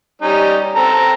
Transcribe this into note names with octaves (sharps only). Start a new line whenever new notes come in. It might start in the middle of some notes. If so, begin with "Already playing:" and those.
G3 C#4 D#4
C4 A4 A#5